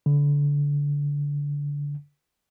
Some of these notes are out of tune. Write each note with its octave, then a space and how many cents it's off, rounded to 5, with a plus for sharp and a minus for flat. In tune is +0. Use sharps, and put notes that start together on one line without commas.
D3 -25